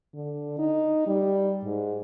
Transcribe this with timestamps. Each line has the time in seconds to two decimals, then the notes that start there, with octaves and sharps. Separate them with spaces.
0.14 D3
0.58 D#4
1.07 G3
1.64 G#2